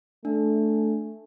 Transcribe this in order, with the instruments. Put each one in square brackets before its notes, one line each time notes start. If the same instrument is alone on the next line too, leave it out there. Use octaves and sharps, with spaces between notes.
[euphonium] A3 [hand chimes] D4